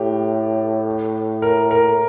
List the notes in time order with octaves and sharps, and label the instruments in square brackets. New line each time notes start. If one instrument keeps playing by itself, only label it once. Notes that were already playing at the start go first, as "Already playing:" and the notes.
Already playing: [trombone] A2 [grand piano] G4
[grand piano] A#4
A#4